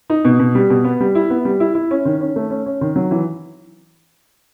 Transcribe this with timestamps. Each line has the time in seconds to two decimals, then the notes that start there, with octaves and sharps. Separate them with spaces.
0.10 D#4
0.25 B2
0.39 B2
0.55 G3
0.70 B2
0.84 B3
1.00 G3
1.15 E4
1.30 B3
1.45 G3
1.60 E4
1.75 E4
1.91 C#4
2.05 D#3
2.21 C#4
2.36 A3
2.50 C#4
2.66 C#4
2.81 D#3
2.96 F#3
3.11 E3